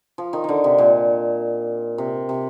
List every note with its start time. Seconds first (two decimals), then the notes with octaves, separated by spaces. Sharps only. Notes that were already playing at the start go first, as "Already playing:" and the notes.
0.18 F3
0.33 D#3
0.44 D3 D#3
0.64 C3
0.78 A#2
1.98 C3
2.29 C3